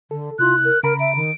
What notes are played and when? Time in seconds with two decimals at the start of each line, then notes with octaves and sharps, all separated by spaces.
0.11 D3 A4
0.39 C3 E4 F4 F#6
0.64 A#4
0.83 C#3 A#4 A#5 B5 D7
0.99 E5 D7
1.15 D#3